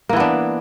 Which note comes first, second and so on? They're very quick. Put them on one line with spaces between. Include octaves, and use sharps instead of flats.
A#3 E3 B3 D4